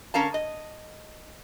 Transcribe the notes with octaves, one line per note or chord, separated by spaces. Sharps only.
D3 C#4 A#4 F5 A5
D#5